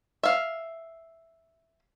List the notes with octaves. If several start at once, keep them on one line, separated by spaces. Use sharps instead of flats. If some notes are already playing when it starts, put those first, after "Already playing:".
E5 F5